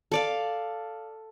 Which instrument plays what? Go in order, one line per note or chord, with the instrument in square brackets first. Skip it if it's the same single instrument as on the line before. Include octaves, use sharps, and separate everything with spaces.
[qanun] A4 D5 F5